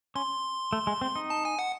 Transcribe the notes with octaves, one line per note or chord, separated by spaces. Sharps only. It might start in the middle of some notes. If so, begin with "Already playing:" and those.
C#4 C6
A3
G#3
C4
D#4
A5
G#5
F#5